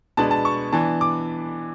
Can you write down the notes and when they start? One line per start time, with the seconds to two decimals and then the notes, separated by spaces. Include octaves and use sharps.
0.17 B2 G#3 B3 D4 A5
0.31 A5
0.45 C#6
0.73 E3 B3 D4 A5
1.01 D6